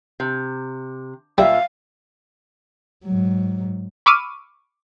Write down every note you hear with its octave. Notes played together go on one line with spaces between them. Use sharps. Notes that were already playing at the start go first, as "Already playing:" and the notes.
C3
A#2 G3 E5 F5
G#2 F#3
B5 C#6 D6 E6 F6 D#7